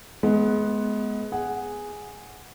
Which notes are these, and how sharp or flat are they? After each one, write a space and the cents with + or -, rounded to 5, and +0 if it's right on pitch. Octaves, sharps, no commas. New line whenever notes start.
G#3 +25 B3 +0
G#4 +0 F#5 +0